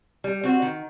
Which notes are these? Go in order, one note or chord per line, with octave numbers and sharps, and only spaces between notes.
G3
C4 F#4
D#3